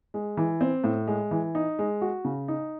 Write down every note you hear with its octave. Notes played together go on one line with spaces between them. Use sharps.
G#3
E3
C4
A2
G#3
E3
D#4
G#3
F#4
C#3
D#4